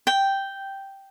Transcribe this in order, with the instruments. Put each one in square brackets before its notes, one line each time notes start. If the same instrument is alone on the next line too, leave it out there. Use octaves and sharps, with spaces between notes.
[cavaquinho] G5